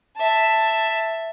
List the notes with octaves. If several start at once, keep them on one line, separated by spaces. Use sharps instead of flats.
E5 A5